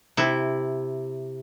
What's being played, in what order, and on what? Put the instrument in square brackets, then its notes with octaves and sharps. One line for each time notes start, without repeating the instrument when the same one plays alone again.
[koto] C3 E4